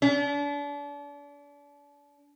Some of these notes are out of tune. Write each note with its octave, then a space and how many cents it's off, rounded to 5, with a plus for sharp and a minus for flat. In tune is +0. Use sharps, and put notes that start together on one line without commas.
D4 -35